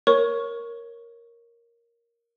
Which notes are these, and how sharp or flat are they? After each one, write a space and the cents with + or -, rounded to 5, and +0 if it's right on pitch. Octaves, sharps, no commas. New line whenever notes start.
A#4 +5 C#5 -5 C#6 +0